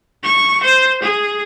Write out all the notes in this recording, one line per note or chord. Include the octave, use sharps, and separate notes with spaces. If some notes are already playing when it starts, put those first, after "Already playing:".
C#6
C5
G#4